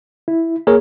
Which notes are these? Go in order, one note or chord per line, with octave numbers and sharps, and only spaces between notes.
E4
A#3 G#4 A#4 C#5